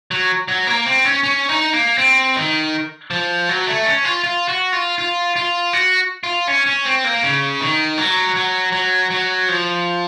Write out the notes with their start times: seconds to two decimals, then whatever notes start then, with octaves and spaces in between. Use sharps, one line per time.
0.11 F#3
0.48 F#3
0.67 A#3
0.86 C4
1.05 C#4
1.23 C#4
1.49 D#4
1.73 A#3
1.98 C4
2.36 D#3
3.11 F3
3.49 F#3
3.67 A3
3.85 C#4
4.05 F4
4.24 F4
4.48 F#4
4.73 F4
4.98 F4
5.36 F4
5.73 F#4
6.24 F4
6.48 C#4
6.66 C#4
6.85 C4
7.04 A#3
7.23 C#3
7.61 D#3
7.98 F#3
8.35 F#3
8.72 F#3
9.11 F#3
9.48 F3